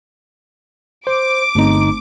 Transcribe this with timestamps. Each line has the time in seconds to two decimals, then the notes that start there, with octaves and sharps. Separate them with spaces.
1.07 C5 D6
1.55 G1 A3 C4 D#4